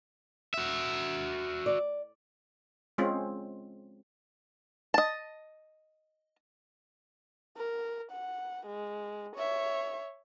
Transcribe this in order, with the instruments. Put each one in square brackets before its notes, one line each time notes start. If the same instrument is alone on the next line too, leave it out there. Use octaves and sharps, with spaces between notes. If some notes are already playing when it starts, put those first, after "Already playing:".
[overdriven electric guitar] F#4 E5
[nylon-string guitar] D5
[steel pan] G#3 C4 C#4 F4
[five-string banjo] D#5 A5
[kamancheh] A#4
F#5
G#3
C#5 E5